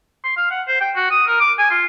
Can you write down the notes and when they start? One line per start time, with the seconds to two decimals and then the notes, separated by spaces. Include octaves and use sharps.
0.24 C6
0.37 F5
0.51 F#5
0.68 C5
0.81 G5
0.96 F#4
1.11 D#6
1.28 A#4
1.40 D6
1.58 G#5
1.71 F4